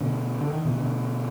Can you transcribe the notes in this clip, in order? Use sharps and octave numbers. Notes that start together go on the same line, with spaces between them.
B2 D3
D3
D#3
B2 D3
B2 D3